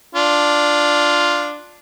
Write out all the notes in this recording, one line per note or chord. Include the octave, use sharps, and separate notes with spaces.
D4 F4